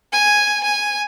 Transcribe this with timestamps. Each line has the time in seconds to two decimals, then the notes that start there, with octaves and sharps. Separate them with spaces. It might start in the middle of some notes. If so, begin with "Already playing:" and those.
0.13 G#5
0.64 G#5